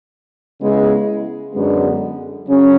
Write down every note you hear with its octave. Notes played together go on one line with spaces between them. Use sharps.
C#3 G#3 B3 E4
F#2 D3 G#3 B3
C#3 F#3 C#4